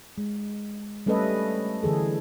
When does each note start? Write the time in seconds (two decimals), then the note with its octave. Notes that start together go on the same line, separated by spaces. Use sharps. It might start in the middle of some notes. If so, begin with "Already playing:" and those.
0.18 G#3
1.06 G3 A3 C#4 A4 B4 D#5
1.83 D3 E3 G#4 A4